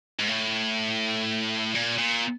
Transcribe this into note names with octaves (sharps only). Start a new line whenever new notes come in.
G#2
A2
A#2
A#2